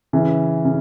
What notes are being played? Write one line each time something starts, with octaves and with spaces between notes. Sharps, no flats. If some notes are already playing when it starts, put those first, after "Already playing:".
C#3 E3
C#3